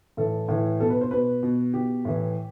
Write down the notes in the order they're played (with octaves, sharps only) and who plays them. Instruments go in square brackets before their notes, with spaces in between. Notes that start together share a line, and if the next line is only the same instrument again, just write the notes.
[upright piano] A2 E3 A4
A2 E3
B2 A4
B4
C5
B2 B4
B2
B2 G4
A2 E3